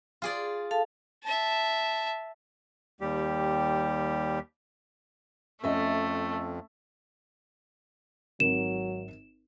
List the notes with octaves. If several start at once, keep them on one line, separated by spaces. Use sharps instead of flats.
F4 G#4 D5
A4 F5 A5
E5 A5
D#2 G3 G4
F2 A3 C#4 D#5 E5
G#1 F#3 A#4 E7